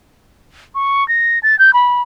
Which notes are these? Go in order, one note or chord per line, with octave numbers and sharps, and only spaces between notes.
C#6
A#6
A6
G6
B5